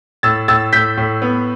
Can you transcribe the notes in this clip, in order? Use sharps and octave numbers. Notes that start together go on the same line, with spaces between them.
A2 E6 A6
A2 E6 A6
A2 G6 B6
A2
B3